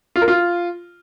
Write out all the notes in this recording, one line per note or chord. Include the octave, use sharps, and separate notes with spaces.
F4
A#4
F4